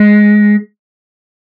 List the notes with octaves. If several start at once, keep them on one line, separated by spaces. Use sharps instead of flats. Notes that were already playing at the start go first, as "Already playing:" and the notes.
Already playing: G#3